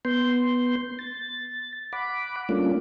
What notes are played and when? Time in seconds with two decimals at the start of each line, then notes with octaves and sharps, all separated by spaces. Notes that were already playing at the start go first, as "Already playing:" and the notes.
0.05 B3 C6 G6
0.99 A6
1.93 F#5 B5 D6
2.49 G3 A3 A#3 C#4 D4 F4